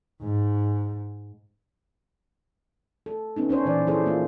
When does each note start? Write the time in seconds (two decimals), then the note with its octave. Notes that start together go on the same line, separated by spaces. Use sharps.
0.22 G#2
3.06 A4
3.36 B3 C#4 D#4
3.49 C#4 D4 C5 C#5
3.65 A#2 E3 D5
3.87 F3 E4 G#4 A4 C5
4.06 A#3 F4